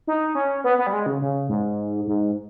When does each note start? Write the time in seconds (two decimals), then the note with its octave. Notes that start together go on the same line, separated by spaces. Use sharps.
0.07 D#4
0.35 C#4
0.64 B3
0.78 B3
0.87 G3
0.93 G#3
1.06 C#3
1.21 C#3
1.49 G#2
2.07 G#2